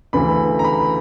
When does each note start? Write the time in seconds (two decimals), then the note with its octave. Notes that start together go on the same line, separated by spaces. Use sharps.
0.13 D2 C#3 E3 A3 B5
0.59 A#5
0.64 B5